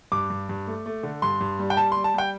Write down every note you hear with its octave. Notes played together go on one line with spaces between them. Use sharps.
G2 D6
G2
G2
A3
A3
D3
G2 C6
G2
G3
G5
G3 A5
G3 C6
A5
G3 G5